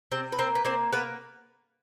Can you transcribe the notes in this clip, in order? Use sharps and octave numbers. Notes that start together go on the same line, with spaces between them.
C3 C4 C5
B4
A#3 C4 C5
B4
A#3 C4 C5
A#3 B3 B4